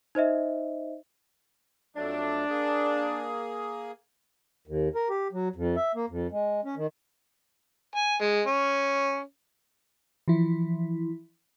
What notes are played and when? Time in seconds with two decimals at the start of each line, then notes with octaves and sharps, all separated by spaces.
0.15 D#4 C5 D#5 E5
1.96 F2 F#3 A3 D4
2.49 A#3 G#4
4.67 D#2
4.95 A#4
5.09 G4
5.32 F#3
5.56 F2
5.76 E5
5.95 A#3
6.09 F2
6.32 G#3
6.65 C#4
6.77 D#3
7.96 G#5
8.21 G#3
8.46 C#4
10.28 E3 F3 E4